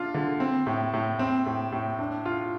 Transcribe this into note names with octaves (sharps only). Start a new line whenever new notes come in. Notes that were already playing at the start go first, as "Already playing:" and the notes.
Already playing: D4 F4
D3
C4
A2
A2
C4
A2
A2
D4
F4